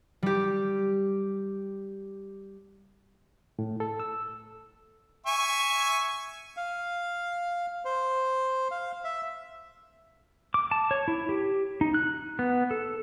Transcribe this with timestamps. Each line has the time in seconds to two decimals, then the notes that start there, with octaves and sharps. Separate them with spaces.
0.23 G3 G4
3.59 A2
3.80 A4
4.00 E6
5.26 E5 G#5 C#6
6.57 F5
7.85 C5
8.71 F5
9.04 E5
10.54 D6
10.71 A5
10.91 C#5
11.08 E4
11.29 G4
11.81 D#4
11.94 F#6
12.39 B3
12.71 A4